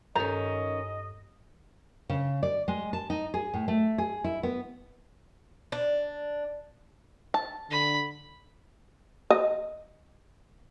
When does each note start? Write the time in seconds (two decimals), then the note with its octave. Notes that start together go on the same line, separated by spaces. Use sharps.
0.15 G2 D#3 C#4 A4 D#5 A#5 G6
2.09 C#3
2.43 D5
2.68 G#3
2.93 A5
3.10 D#4
3.34 G#4
3.54 A2
3.68 A3
3.98 G#4
4.24 E4
4.43 B3
5.72 D4
7.34 A5
7.70 D3 B5
9.30 D#5